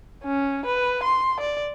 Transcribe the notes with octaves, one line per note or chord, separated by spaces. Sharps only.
C#4
B4
C6
D5